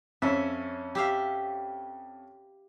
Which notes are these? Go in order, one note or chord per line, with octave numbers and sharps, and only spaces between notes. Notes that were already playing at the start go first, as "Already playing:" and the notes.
F2 C#4 E5
G4 E5 F5